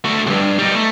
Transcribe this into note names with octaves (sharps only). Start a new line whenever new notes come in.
A3 F#4
C2 G2
G3 D#4
A3